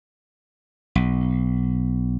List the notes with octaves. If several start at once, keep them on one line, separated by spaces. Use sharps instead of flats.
B1